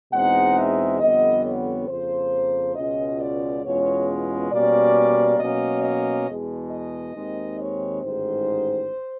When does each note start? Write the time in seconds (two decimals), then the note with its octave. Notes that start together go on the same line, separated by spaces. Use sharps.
0.13 E2 B2 G#3 C4 D#4 F#5
0.57 E5
1.01 F2 D3 G3 B3 D#5
1.44 C#5
1.88 F2 C#3 F3 A#3 C5
2.76 C#2 B2 G#3 C#4 F4 D#5
3.20 D5
3.64 E2 B2 G#3 C#4 F4 C#5
4.51 B2 G3 A#3 C#4 D5
5.40 B2 F#3 A#3 C#4 D#5
5.84 D#5
6.28 E2 B2 G#3
6.71 D#5
7.15 D#2 D#3 G#3 C4 D#4
7.59 C#5
8.03 A1 G#2 D#3 G#3 C5